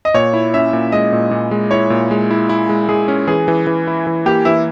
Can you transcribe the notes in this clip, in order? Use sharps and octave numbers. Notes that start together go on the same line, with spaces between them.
D#5
A#2 C#5
E4
C#4 E5
A#2
G#3 D#5
A#2
A#2
G#3
E4 C#5
A#2
G#3
E4
E4
G#3
G#3 G#4
C#4
E3 G#4
E3
E3
E4
E3
A#3 G4
E3 E4